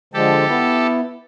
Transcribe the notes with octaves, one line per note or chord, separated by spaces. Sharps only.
D3 F3 G#3 G4 A4
B3 E4